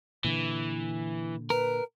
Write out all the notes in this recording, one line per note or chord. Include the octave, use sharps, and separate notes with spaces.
A#2 D3 E3
A#4 B4